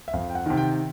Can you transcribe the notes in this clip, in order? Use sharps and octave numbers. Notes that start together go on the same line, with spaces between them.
E5
F2 F5
G5
F#5
C3 D#3
G5